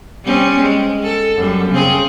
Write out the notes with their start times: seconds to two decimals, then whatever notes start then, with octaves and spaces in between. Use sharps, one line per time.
0.25 G3 C4 C#4
0.60 G#3
1.03 A4
1.36 F#2 G3
1.72 C#3 C4 G#4